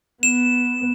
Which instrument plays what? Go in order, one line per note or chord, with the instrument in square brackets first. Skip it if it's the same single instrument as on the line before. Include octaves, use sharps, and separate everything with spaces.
[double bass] B3 [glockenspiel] E7